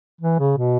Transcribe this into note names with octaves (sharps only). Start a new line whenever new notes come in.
E3
C#3
B2